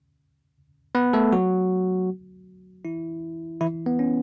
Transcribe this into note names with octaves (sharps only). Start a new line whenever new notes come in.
B3 B4
A3 A4
F#3 F#4
E3 E4
E3 E4
B3
C#4